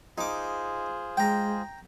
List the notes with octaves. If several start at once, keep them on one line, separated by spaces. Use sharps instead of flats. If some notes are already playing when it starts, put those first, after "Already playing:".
D#4 F4 G#4 C5 D6
G#3 G5 A#5